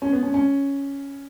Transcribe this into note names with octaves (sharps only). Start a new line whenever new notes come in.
C#4
B3
C#4
C#4